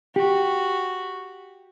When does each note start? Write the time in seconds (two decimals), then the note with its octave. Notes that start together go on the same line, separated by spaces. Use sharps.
0.16 F#4 G4